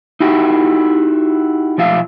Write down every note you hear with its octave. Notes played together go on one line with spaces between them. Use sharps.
D#4 E4 F#4 G4
B1 F3 F4 E5 F5